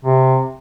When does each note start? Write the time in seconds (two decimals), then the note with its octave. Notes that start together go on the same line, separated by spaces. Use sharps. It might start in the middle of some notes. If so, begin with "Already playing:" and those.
0.05 C3